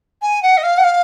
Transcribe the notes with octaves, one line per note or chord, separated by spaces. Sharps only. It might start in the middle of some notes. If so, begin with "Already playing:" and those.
G#5
F#5
D#5
F5
F#5
F5